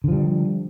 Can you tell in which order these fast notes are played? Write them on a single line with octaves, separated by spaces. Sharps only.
D3 F3 G3